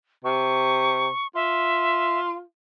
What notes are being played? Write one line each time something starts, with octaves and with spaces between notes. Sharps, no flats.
C3 C#6
F4 E5